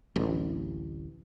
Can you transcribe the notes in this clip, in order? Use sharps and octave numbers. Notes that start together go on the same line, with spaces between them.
D1 A1